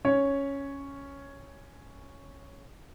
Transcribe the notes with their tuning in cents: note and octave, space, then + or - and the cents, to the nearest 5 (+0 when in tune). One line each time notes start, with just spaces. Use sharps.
C#4 +0 C#5 +0